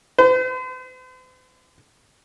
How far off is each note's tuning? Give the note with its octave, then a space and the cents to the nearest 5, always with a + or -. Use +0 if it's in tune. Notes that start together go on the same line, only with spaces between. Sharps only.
C5 -45